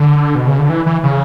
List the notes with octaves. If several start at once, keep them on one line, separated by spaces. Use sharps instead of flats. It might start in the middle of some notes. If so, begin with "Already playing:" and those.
Already playing: D3
B2
C#3
D3
E3
E3
C#3